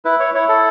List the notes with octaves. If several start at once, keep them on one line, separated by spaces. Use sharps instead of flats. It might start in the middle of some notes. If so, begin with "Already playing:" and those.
E4 B4
C#5
E4 C#5
A4